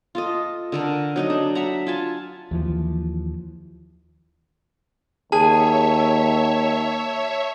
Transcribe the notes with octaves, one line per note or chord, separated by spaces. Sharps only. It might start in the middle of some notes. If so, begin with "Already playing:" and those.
F4 A4 D#5
D3 A4 A#4
F#3 D#4 D#5
D4
E5 F#5 A#5
F4 G#5 A5
D#2 E3 F3
D#2 G#4 C#5 E5 A5